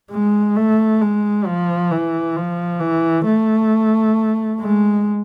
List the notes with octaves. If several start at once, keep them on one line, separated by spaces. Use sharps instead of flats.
G#3
A3
G#3
F3
E3
F3
E3
A3
G#3